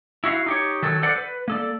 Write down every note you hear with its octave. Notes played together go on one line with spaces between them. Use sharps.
E4 F#4 E5 F5
D#4 G4 C#5
D#3 F#3 A4
A4 C5 D5 F#5
B4
A#3 A4 D5